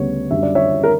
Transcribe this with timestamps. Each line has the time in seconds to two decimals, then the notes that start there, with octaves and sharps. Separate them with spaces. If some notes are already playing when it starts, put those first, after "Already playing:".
Already playing: D2 C#3 G3 B3 C#5
0.31 F#2 D3 G3 E5
0.43 D5
0.55 C#5 E5
0.84 A#4